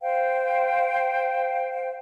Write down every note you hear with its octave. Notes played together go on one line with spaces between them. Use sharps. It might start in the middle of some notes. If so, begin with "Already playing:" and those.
C5 F5 G5